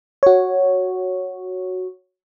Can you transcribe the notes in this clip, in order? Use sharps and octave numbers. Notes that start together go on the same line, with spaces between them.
F#4 C#5